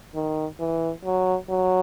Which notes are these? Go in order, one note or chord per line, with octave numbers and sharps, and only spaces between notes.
D#3
E3
F#3
F#3